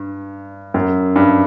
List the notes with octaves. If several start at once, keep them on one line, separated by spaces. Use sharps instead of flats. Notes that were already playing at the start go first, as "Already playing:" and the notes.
Already playing: G2
F#2
G2